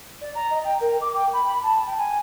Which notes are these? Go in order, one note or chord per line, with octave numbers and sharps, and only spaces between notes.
D5
A#5
D#5
G5
A#4
D6
G5
B5
A5
G5
G#5